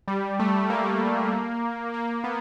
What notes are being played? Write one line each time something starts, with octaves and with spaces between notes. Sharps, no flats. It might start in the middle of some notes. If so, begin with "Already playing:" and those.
G3
A3
A#3
A#3
B3